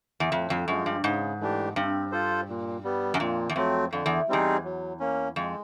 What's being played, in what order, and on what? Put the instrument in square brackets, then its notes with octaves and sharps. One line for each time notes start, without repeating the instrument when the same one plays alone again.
[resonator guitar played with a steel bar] E2
[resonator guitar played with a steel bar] F2 [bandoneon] A2
[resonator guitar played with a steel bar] F2
[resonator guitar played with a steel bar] F#2 [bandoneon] F3 G#3
[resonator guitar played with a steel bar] G2
[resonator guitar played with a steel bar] G#2 [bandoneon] C#3
[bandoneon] E3 A3 D4 G4
[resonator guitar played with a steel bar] G2 [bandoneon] C4
[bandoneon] F4 A4 C5
A#2
G3 B3
[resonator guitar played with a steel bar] F#2
[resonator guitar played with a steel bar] F2 [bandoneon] A#2
[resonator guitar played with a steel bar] E2
[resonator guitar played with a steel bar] F2 [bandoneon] F#3 A3 C4
[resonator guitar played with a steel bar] F2 [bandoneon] D3
[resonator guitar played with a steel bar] E2
[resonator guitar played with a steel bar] E2 [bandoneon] G3 C4 D#4 G#4
[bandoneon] F#3
A#3 C#4
[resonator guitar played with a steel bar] F2 [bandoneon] G#3